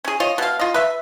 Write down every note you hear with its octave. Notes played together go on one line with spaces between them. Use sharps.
C#4 G#4
F4 C#5 D#5
B2 F5
F4 D#5
B4 E5